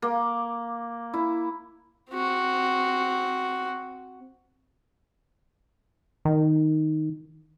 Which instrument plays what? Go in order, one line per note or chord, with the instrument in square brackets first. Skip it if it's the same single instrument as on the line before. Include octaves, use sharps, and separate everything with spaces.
[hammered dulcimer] A#3
E4
[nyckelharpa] C4 F#4
[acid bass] D#3